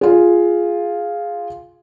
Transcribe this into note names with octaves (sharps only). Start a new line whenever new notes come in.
F4 G#4